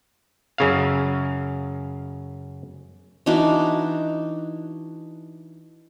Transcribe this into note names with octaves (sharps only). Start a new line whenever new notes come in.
F#2 C#3 F5
E3 D4 D#4 F#4